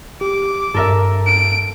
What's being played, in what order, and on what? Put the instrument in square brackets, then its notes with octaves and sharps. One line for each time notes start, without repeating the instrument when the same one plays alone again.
[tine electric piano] G4 [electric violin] D6
[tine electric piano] G2 [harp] A4 A#4 E5
[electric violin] D7